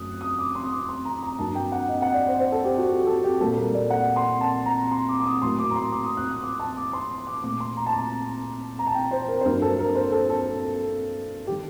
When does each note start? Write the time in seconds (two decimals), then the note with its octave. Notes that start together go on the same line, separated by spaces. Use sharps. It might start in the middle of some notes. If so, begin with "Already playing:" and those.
Already playing: F#2 F#3 A3 D#6 F#6
0.21 D#6
0.39 D6
0.55 C6
0.64 D#6
0.72 D6
0.89 C6
1.05 A#5
1.23 A#5
1.39 G2 F#3 A#3 A5
1.55 G5
1.72 F#5
1.89 D#5
2.02 F#5
2.14 D5
2.27 C5
2.39 C5
2.52 A4
2.64 G4
2.78 F#4
2.90 G4
3.07 A4
3.24 G4
3.40 A#2 G3 A#3 A4
3.57 A#4
3.74 D5
3.90 F#5
4.16 C6
4.41 A5
4.66 A#5
4.92 C6
5.09 D6
5.20 D6
5.25 D#6
5.42 A2 F#3 A#3 C6
5.59 D6
5.71 A#5
5.76 C6
5.92 D6
6.04 D#6
6.17 F#6
6.30 D#6
6.43 D6
6.59 A5
6.77 D6
6.93 C6
7.27 D6
7.43 A#2 A3 D6
7.60 C6
7.77 A#5
7.86 A5
7.93 A#5
8.79 A#5
8.87 A5
8.94 G5
9.11 C5
9.29 A#4
9.41 C5
9.45 G2 F#3 A#3 A#4
9.62 A4
9.79 A#4
9.95 C5
10.12 A4
10.29 A4
11.47 D#3 G3 G4